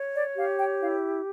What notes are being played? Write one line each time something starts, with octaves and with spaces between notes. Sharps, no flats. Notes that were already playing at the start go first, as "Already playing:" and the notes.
Already playing: C#5
D5
G4 F5
G5
E4 F5